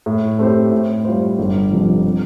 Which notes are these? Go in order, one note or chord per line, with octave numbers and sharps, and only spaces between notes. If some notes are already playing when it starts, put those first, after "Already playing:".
A2
A3 C4 G4 C5
A2
G3 F4 C5
G1
F2 C3 F3
C3